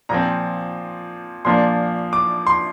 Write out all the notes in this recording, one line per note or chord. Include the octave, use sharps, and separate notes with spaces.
A#2 F3 C4 A#5
A#2 F3 A#3 D4 C6
D6
C6